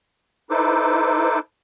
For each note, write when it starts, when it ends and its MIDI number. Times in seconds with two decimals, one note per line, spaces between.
0.50 1.39 63
0.50 1.39 64
0.50 1.39 69
0.50 1.39 71
0.50 1.39 72
0.50 1.39 86